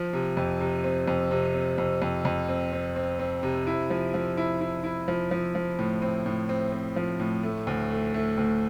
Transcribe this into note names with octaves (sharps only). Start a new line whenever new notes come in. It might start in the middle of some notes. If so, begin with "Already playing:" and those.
Already playing: F3
C3
F2
C3
C4
F2
C3
C4
F2
F2
F2
C4
C4
C4
C4
C3
E4
F3
F3
E4
E4
E4
F3
F3
F3
A2
C4
A2
C4
C4
F3
A2
A3
D2
A3
A3
D2